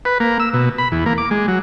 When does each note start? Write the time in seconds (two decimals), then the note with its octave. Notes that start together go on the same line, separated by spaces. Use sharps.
0.05 B4
0.20 A#3
0.40 E6
0.53 B2
0.78 B5
0.92 E2
1.06 A#3
1.18 D6
1.31 G#3
1.48 F#3